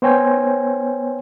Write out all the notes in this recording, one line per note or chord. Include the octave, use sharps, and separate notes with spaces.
B3 C5 C#5 G5 G#5